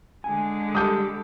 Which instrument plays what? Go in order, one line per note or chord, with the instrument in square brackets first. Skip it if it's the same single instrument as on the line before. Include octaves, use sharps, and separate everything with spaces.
[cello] D3 G#3 [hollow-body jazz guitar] G#5
[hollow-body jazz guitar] G3 [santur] A4 B5 D6 [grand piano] D#6 G6